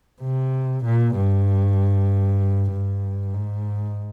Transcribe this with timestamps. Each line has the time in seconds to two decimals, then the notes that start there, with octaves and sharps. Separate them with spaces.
0.22 C3
0.85 A#2
1.16 G2
2.71 G2
3.34 G#2